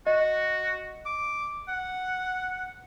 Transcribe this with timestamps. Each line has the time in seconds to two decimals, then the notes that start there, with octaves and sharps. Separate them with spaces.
0.06 F#4 D#5
1.06 D6
1.69 F#5